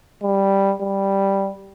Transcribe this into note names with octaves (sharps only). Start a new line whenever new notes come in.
G3
G3